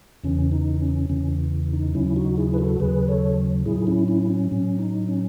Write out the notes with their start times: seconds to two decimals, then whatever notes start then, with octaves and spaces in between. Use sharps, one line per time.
0.24 E2 C#3 E3 C#4
0.52 D#4
0.81 C#4
1.09 E2 C#3 E3 C#4
1.73 D#4
1.94 D#2 C#3 F#3 C#4 E4
2.16 D#4 F#4
2.37 E4 G#4
2.54 B4
2.58 F#4 A4
2.80 D#2 C#3 F#3 G#4 B4
3.08 A4 C#5
3.66 A2 F#3 E4 G#4
3.87 C#4 E4
4.08 C#4 E4
4.30 C#4
4.51 A2 F#3 C#4
4.79 D#4
5.08 C#4